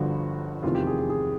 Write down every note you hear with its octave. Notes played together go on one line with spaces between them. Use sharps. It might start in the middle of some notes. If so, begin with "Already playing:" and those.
Already playing: G1 G2 D3 F3 F#4
F1 E2 C3 D#3 F4
G4
G#4
G#4
G#4